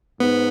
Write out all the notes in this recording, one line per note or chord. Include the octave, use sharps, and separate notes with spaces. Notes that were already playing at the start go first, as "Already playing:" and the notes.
G#2 B3